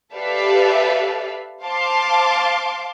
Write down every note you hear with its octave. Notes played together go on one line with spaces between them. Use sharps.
G4 A4 B4 D5 E5 F5
C5 F5 A5 C6 D6